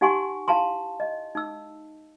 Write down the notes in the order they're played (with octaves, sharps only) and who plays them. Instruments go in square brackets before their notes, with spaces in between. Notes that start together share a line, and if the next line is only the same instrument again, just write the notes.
[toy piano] D#4 G4 F#5 G#5 C6 C#6
E4 F5 A5 A#5 C6
D#5
D#4 E6